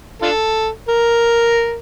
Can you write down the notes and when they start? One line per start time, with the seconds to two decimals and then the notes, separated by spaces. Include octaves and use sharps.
0.22 D4 F4 A4
0.89 A#4